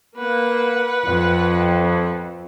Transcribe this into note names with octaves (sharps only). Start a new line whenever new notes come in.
A#3 B4 F#5
F2